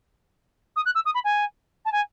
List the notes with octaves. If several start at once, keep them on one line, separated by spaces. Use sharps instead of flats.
D#6
F#6
E6
D#6
B5
G#5
A5
G#5